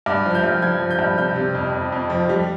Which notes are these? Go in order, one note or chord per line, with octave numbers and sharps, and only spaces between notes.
G2 D6
F3
F6
G6
G2
F3 G#6
F3
G6
G2
C3 G6
C3
F2
F2
F2
F3
G3